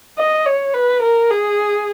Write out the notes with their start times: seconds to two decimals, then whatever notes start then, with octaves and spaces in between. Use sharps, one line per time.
0.18 D#5
0.46 C#5
0.74 B4
1.02 A#4
1.31 G#4